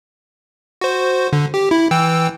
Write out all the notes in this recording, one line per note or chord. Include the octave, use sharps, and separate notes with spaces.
F#4 C5
D3
G4
E4
E3 G5 E6